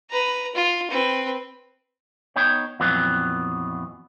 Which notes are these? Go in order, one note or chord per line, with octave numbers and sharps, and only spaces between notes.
B4 A#5
F4
C4 B4
B3 D#4 C#5 G5
F2 A#2 E3 F#3 B3